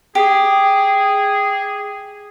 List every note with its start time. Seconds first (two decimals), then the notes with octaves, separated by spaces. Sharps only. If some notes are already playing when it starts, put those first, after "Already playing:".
0.15 G4 G#4